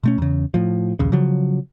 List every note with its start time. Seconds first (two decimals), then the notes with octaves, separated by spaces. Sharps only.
0.03 B2 A3 C#4
0.18 E2 C#3
0.54 A2 F3
0.99 A#1 D#2 C#3
1.12 C#3 F3 F#3